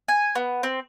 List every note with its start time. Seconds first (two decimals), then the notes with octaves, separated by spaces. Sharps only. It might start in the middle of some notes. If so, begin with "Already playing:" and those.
0.08 G#5
0.35 B3
0.63 C4